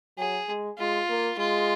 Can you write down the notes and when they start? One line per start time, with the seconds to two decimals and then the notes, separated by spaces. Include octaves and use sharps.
0.18 F#3 G#4
0.49 G#3
0.78 G#3 F4
1.09 A#3
1.39 G#3 F4